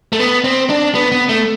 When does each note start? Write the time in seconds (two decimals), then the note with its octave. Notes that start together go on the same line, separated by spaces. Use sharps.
0.13 A3
0.19 B3
0.44 C4
0.70 D4
0.95 B3
1.12 B3
1.29 A3